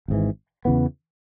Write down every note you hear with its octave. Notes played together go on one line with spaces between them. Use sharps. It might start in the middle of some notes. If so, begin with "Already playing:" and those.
G#1 G#2 E3
E2 C#3 E3 B3